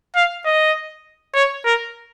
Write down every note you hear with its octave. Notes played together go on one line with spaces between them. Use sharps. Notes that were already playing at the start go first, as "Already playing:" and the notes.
F5
D#5
C#5
A#4